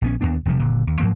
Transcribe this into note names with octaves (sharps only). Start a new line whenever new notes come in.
A#1 B3 C#4
D#2 A2 B3 D4
E1 C3 F3 G3
F#1 A#2 D3
D#2
G#2 F3 F#3 A#3